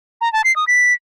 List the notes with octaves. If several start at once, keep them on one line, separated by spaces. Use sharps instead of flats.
A#5
A5
C7
D#6
B6